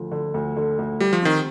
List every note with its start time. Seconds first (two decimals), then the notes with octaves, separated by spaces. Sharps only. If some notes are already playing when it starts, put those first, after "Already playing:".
Already playing: D2 D3 F3
0.12 D3
0.34 D2
0.57 D3
0.79 D2
1.00 G3 G4
1.13 F3
1.23 D#3 C4